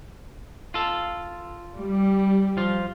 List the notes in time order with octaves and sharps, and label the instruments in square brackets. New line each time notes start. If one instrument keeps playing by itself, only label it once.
[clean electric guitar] F4 A4
[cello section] G3
[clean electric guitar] F3 F4